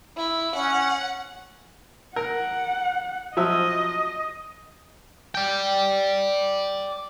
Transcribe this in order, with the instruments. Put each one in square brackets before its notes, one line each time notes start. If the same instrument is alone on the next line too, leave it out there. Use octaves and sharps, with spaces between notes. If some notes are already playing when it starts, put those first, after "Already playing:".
[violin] E4
[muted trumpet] C#4 [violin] F#5
[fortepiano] A#4 [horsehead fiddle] F#5
[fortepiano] F3 F#3 E5 [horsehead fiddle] D#5
[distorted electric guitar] D5 G5